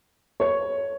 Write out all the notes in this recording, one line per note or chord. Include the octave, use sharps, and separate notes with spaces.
C#5